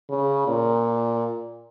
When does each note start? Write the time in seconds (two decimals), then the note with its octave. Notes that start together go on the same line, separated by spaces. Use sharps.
0.10 C#3
0.48 A#2